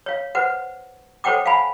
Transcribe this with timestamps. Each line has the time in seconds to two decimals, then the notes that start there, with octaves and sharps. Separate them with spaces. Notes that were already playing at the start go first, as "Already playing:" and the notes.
0.06 C#5 F5
0.35 B4 C5 F#5
1.24 A4 C5 C#5 F#5 G5 D6
1.46 F5 F#5 G#5 B5